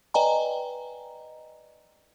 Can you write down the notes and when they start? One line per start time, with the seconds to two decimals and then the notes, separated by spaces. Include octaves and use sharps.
0.14 B4 D5 D#5 G5 G#5 A#5